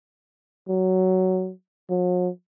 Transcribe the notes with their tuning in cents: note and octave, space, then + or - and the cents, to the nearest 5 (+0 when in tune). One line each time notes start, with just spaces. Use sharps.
F#3 +10
F#3 -45